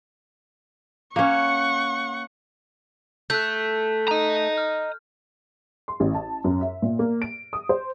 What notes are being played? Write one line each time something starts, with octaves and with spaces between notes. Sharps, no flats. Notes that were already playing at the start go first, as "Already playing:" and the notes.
A#3 C#4 F#5 C#6
A3 F#6 G6
D#5 A#5
F6
C6
A1
A5
F#2
E5
A#2
A#3
D7
D#6
C5